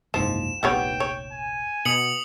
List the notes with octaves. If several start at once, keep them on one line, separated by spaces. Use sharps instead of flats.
F#1 C2 G#2 F3 E7
F1 A#1 G3 B3 C#5 G5
C#5
G#5
B2 D#6 C#7 F#7